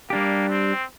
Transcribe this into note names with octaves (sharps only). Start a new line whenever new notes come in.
G3 A#3 D4 G4
C4